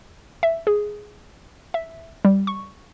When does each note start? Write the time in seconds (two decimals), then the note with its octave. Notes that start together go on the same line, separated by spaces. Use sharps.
0.43 E5
0.67 G#4
1.74 E5
2.25 G3
2.47 C#6